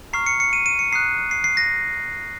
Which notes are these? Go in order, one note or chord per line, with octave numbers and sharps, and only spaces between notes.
A#5 C#6 F6 C7
C#7
C#7
D#7
D#7
C#7
A#5 D#6 F#6 C7
C7
C7
A#6